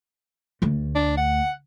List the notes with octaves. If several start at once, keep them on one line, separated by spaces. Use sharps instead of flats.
D2 A3
D4
F#5